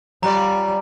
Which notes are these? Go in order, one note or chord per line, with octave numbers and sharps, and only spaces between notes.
G3 C#4 F4 D5 A#5